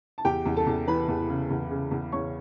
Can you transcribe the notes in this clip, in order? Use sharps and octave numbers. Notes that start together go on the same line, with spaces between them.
A5
E2 G4 G5
E2
A4 A5
E2
E3 B4 B5
E2
C#3
E2
C#3
E2
E2 C#5 C#6